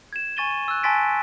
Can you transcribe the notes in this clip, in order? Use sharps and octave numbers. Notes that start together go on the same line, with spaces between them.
G#6 E7
G#5 C#6 A6 D#7 G7
E6 F#6
G#5 A5 C6 A6 B6 D7